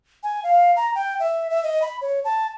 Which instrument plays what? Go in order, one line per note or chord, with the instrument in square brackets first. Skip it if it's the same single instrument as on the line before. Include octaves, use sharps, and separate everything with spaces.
[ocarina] G#5
F5
A#5
G5
E5
E5
D#5
B5
C#5
A5